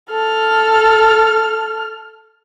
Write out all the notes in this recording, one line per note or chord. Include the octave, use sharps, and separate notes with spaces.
A4 F6